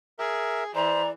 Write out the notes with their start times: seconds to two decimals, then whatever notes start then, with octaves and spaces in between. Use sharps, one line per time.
0.19 G#4 A#4 E5
0.75 E3 C5 D5 A#5